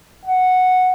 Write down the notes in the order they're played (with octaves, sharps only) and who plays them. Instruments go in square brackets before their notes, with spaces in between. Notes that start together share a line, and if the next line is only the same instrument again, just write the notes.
[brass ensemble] F#5